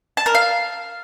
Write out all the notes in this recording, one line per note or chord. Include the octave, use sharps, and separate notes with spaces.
A5
A#4
F5